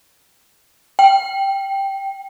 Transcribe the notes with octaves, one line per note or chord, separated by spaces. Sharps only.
G5